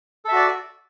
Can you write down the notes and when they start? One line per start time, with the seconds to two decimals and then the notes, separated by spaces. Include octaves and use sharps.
0.25 A4
0.28 E5
0.32 F#4
0.35 D5